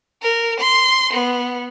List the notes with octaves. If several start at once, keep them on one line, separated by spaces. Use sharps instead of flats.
A#4
C6
B3